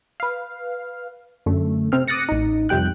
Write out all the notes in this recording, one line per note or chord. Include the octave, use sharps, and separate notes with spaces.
B4 F5
F#2 D3 A3
C3 C4 F6
D6 D#6 F#6 A6 A#6 C#7
A1 D#4
F2 C3 G3 G5 F#6